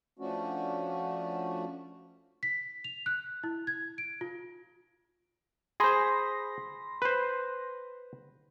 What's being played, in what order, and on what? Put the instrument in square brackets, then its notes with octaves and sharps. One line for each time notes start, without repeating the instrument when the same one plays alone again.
[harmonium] F3 A3 C#4 D4 F#4
[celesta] B6
F7
F#6
E4
G#6
D7
F4
[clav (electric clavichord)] G#4 C5 [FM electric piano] B5 C6 A#6
[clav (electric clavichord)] B4 C5